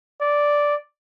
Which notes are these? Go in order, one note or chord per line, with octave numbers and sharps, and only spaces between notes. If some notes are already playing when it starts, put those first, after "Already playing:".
D5